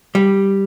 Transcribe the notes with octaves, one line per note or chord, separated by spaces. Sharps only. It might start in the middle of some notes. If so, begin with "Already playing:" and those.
G3